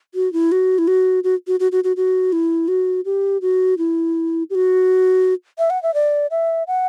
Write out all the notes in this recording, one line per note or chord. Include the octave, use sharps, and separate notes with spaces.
F#4
E4
F#4
E4
F#4
F#4
F#4
F#4
F#4
F#4
F#4
E4
F#4
G4
F#4
E4
G4
F#4
E5
F#5
E5
D5
E5
F#5